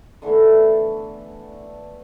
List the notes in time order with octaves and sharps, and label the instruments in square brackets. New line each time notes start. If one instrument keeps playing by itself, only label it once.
[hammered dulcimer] D3 E3 A3 B3